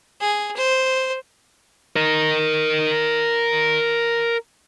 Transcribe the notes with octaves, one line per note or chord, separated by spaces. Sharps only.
G#4
C5
A#4 D#5